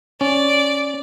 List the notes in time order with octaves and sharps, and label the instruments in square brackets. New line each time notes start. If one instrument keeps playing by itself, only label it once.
[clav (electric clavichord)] C#4 [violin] D5